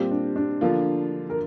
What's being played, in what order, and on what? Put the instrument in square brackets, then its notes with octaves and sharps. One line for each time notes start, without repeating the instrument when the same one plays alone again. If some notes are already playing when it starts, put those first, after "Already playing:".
Already playing: [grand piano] A#2 G3 C4 F4 [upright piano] G4
[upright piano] D4
D4
[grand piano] D3 F3 A#3 F4
[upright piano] A#4